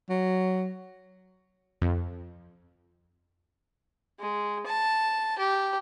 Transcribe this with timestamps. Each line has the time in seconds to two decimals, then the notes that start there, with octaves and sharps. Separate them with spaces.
0.10 F#3
1.82 F2
4.20 G#3
4.66 A5
5.39 G4